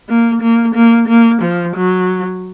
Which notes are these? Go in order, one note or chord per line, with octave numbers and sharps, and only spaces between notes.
A#3
A#3
A#3
A#3
F3
F#3